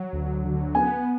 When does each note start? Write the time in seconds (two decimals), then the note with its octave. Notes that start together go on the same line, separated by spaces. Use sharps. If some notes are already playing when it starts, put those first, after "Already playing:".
Already playing: F#3
0.13 D2
0.44 D3
0.75 B3 G#5